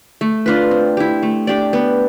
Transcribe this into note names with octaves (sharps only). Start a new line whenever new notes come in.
A3
D4 F4 B4
C4
E4 G4
A3
D4 G4 D5
B3